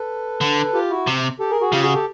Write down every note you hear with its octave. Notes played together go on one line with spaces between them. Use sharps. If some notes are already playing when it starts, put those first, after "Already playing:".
Already playing: A4 B4
D3
F4 G4
E4 F#4
C3
G4 A4
G#4 A#4
F#4 G#4
C#3 F4 G4
F#4 G#4
G4 A4